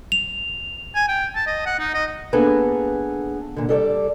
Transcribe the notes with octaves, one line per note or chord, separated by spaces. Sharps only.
F7
G#5
G5
A5
D#5
F#5
D#4
D#5
A#3 B3 D4 G#4 A4 B4
A#2 D3
G3 A4 C#5 D5